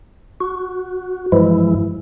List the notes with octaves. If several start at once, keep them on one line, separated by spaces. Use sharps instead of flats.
F#4
G2 E3 F3 G#3 E4